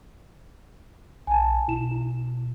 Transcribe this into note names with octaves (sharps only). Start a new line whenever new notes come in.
B1 G#5 A5
B2 E4 E7
E4